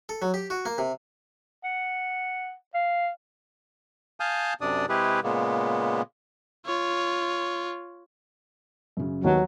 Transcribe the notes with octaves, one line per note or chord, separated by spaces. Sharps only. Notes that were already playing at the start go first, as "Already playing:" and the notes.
A4
F#3
G4
F#4
A#3
C3
F#5
F5
F5 G#5 A5 D#6 F6 G6
F#2 C3 D4 D5 D#6
C3 G#3 E4 G4 G#4 B4
A#2 C#3 G#3 A#3 B3
F4 C#5
F#2 C#3
D#2 D#3 F#3 B3